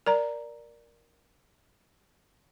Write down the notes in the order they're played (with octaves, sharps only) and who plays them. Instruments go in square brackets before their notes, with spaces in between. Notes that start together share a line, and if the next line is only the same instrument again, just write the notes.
[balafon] A#4 D5 A#5